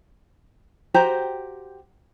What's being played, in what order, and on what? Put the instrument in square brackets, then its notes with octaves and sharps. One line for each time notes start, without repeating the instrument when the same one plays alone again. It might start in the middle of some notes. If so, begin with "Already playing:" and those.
[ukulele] F#4 G4 C5 A#5